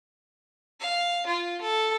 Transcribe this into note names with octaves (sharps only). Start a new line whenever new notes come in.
F5
F4
A4